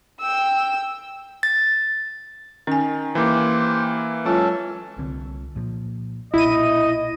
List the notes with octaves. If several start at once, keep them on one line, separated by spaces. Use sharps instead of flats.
G5 E6
A6
D#3 C#4 G#5
E3 A#3 G4 C5 G5
F#3 G#3 C#4 F4 A4 A5
C2 D3 C4
A#2 F3
B1 A#2 E4 D#5 D#7